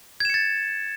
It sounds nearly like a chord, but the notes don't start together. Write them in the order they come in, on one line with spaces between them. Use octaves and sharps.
G#6 E7 C#7 A6